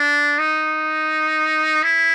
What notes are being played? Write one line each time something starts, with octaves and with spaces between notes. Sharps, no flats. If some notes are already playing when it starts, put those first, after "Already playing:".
Already playing: D4
D#4
E4